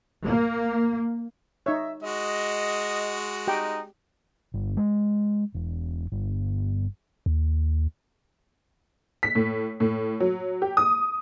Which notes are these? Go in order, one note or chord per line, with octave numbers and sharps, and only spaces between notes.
A#3
D#4 C#5 E5
G#3 F#4 D#5
D#4 G4 G5
G1
G#3
E1
G1
D#2
B6
A2
A2
F#3
G4
D#6